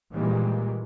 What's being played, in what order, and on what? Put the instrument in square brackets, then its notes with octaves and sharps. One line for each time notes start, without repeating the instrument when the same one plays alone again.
[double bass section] A#2 D#3 E3 G3 G#3 A#3